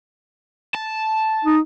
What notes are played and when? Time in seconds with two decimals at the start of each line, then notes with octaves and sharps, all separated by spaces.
0.74 A5
1.44 D#4